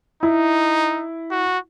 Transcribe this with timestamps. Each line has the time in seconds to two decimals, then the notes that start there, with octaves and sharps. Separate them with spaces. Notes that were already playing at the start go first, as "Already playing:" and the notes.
0.23 D#4 E4
1.31 F#4